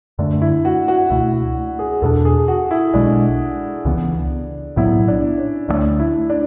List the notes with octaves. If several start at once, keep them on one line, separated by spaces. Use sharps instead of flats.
F#2 D3 A3 D4
E4
F#4
F#4
C#2 B2 A3 E4
G#4
E2 B2 A3 D4 A4
G#4
F#4
E4
B1 B2 G#3 D4
C#2 C#3 E3 B3
B1 A2 F#3 B3 E4
D4
C#4
D2 D3 A3 D4
E4
D4